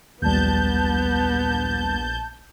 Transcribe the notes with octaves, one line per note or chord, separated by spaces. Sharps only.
A#1 D#2 G3 B3 A5 G6